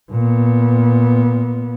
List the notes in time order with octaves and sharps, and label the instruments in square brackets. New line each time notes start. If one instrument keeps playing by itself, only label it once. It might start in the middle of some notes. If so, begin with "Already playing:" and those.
[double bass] A#2 B3